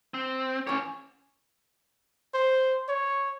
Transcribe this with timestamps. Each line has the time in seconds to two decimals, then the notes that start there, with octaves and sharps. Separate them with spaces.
0.14 C4
0.67 E3 C#4 C#5 G#5 D6
2.34 C5
2.89 C#5